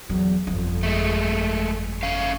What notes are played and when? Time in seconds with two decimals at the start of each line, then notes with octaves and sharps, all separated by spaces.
0.10 E2 F#3
0.47 G1 F2
0.83 G#3 A3
2.03 A3 C#4 F5